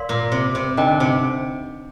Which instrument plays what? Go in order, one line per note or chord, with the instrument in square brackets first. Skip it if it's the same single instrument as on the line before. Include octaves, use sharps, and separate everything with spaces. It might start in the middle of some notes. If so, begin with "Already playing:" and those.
Already playing: [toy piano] A#4 D5 F5 C6
[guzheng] A#2
C3
C3
[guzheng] D3 [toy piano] D#4 A#4 D#5 G5
[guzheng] C3